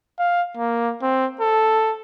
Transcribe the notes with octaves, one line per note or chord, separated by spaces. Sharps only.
F5
A#3
C4
A4